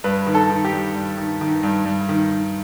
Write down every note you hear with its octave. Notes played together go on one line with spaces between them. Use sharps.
G2 B4
D#3
A4
D#3
G4
G2
G2
D#3
D#3
G2
G2
D#3
D#3